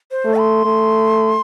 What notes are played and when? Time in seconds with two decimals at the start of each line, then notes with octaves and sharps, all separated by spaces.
0.11 C5
0.25 A3
0.39 C6
0.65 A3